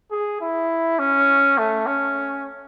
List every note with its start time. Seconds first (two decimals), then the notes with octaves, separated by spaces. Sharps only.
0.11 G#4
0.41 E4
0.99 C#4
1.58 A3
1.86 C#4